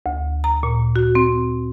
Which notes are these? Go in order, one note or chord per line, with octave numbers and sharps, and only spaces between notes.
D2
A#5
A#2
F#4
C4